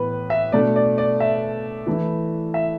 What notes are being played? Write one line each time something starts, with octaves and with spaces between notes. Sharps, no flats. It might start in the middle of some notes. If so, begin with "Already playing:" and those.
Already playing: A2 E3 B3 B4
E5
B2 A3 D4 D5
D5
D5
E5
E3 A3 E4
E5